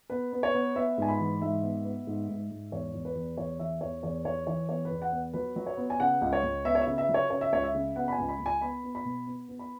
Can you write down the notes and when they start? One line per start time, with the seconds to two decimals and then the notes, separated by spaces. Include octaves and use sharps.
0.10 B3 B4
0.33 B3
0.43 C#5
0.54 B3
0.75 B3 E5
0.98 G#2 G#5
1.08 B5
1.20 E3
1.41 G#2 E5
1.63 B3
1.85 B3
2.07 G#2
2.29 G#2
2.51 G#2
2.72 E2 C#5
2.94 E2
3.05 B4
3.15 E2
3.37 E2 C#5
3.59 E3 E5
3.81 E2 C#5
4.03 E2 C#5
4.25 E3 C#5
4.47 E3 C#5
4.69 B3 C#5
4.85 B4
4.90 E2
5.02 F#5
5.12 B3
5.34 F#3 B4
5.56 F#3
5.66 C#5
5.77 B3
5.90 G#5
6.00 C#3 F#5
6.22 C#2
6.33 C#5
6.43 C#2
6.65 B3 E5
6.75 C#5
6.81 E5
6.87 C#3
6.98 E5
7.09 F#3
7.14 C#5
7.30 C#3 C#5
7.41 E5
7.53 C#2 C#5
7.63 E5
7.75 C#3
7.96 B3 F#5
8.08 B5
8.12 G#5
8.18 C#2
8.28 B5
8.40 C#2
8.46 G#5
8.61 B3 B5
8.84 B3
8.95 B5
9.05 B2
9.26 B3
9.48 B3
9.59 B5